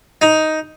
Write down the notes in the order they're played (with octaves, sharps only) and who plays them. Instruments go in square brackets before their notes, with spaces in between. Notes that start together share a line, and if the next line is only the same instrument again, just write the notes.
[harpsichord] D#4